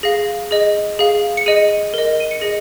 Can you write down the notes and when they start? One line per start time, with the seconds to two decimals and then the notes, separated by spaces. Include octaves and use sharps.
0.03 G#4 F5 A#6
0.51 G#4 D#5
0.99 G#4 F5
1.37 C#7
1.46 G#4 D#5 D#7
1.94 A#4 D#5
2.20 D#7
2.31 C#7
2.41 G#4 D#5 A#6